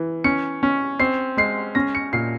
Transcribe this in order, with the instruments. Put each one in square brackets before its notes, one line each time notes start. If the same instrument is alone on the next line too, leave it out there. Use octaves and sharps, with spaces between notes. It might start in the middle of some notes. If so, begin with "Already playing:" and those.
Already playing: [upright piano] E3
C#4 C#7
C#4
C4 C7
G#3 C7
C#4 A#6
C#7
A#2 C7